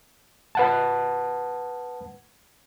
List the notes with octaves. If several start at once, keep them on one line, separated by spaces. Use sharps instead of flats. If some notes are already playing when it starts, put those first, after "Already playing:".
B4 F#5 A5